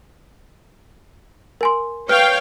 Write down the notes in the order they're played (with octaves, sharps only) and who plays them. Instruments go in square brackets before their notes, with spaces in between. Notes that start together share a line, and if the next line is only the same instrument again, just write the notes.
[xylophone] A#4 G#5 C6
[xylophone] B4 F6 [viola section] C#5 F5 G5